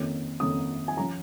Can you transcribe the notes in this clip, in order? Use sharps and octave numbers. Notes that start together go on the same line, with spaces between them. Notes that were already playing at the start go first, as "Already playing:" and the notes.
Already playing: F2 D#3 A#3 C#4
F2 D#3 A#3 C#4 D#6
G#5
F3 C#4 A#5